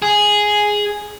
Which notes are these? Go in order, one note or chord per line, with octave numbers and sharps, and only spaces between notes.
G#4